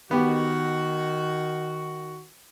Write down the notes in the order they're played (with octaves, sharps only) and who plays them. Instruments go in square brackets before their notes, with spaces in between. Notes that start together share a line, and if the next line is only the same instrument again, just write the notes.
[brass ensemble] D#3 F#4 [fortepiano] B3 G4